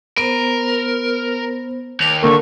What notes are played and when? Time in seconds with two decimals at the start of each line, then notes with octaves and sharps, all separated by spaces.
0.17 B3 A#4 C5 D7
2.00 D#2 F7
2.23 D3 A#3 A#4 C#6